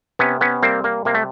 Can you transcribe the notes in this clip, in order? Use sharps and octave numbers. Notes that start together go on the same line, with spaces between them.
C3 B3 C#4
B3 C#4
G3 A#3 C4
A#3
C3 A#3
A3